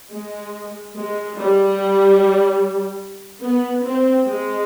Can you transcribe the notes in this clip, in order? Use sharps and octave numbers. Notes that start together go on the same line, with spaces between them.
G#3
G#3
G3
B3
C4
G#3